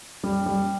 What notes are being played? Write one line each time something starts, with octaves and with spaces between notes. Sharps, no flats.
G3
G3